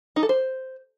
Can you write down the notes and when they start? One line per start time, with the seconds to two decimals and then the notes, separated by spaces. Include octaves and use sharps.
0.16 D#4
0.23 A4
0.29 C5